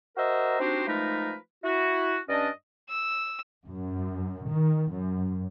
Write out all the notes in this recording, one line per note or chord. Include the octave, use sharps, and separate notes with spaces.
F#4 A#4 C5 D#5 E5 A#5
C4 D4 D#4 F#4 G4 C5
F3 G#3 A3 D#4 A#4 B4
E4 F#4
G2 C#4 D4 D5 D#5
E6
F#2
D#3
F#2